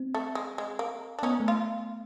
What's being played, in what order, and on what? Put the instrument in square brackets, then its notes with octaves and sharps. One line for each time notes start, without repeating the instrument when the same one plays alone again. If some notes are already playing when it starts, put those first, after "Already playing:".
Already playing: [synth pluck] C4
[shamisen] A3
G#3
G#3
A#3
D4
[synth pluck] B3 [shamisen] C#4 D#4
[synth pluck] A3
[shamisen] F4